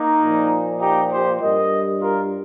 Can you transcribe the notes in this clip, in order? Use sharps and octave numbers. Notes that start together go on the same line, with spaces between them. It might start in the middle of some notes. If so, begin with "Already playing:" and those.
Already playing: A#3 D#4
A#2 F3
D#4 G4
G4 C5
G2 G3 A#4 D#5
F4 A#4